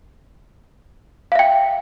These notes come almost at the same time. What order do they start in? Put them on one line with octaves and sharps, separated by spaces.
F5 E5 G5